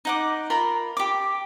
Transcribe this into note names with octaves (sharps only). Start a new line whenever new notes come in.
D#4 F#5 D6
F4 A#4 A#5 B5
G4 D6